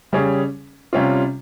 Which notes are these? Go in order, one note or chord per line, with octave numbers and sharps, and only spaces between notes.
C#3 G3 C#4 G#4
C3 G3 C#4 F4